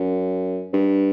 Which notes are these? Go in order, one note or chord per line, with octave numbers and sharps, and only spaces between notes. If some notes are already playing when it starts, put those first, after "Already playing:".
Already playing: F#2
G2